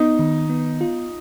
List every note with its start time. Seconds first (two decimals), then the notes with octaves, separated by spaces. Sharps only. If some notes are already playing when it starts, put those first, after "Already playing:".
Already playing: B3 D#4
0.19 D#3
0.50 B3
0.81 F4